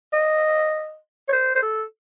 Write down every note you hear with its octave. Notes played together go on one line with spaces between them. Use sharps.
D#5
C#5
C5
C5
A4